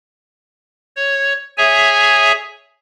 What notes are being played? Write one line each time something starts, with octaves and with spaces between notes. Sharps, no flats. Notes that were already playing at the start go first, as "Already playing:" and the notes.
C#5
G#4 C#5 E5 G#5